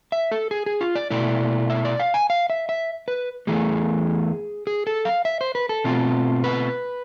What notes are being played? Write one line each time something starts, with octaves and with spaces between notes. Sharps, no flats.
E5
A4
G#4
G#4
F4
D5
B2 A3 E4 D5
E5
D5
F5
G#5
F5
E5
E5
B4
E2 C3 E3 A3 G#4
G#4
A4
F5
E5
C5
B4
A4
B2 A3 C4 F4
B4